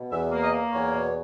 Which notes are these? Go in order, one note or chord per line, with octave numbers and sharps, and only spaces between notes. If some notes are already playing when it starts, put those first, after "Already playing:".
Already playing: B2
E2 E5
A#3
D#5
A#3
E2 C#5
B2